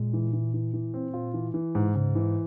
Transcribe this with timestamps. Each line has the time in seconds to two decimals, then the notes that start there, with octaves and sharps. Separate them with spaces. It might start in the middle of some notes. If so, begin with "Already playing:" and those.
Already playing: A#2 G#3
0.13 E3
0.33 E3
0.54 E3
0.73 E3
0.94 C4
1.14 F4
1.34 E3
1.54 E3
1.75 G#2
1.95 G#2 C#3
2.15 E3